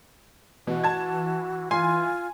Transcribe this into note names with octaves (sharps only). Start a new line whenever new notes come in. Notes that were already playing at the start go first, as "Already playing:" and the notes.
B2 E3 F#4
A5 G#6
F4 G#5 C6